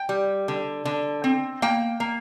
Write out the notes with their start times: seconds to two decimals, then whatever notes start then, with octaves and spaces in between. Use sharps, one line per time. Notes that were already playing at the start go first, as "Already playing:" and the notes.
Already playing: G5
0.09 G3
0.48 D3
0.85 D3
1.24 C4
1.62 A#3 G5
2.00 A#3